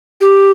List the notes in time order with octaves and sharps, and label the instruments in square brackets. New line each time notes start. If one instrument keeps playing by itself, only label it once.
[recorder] G4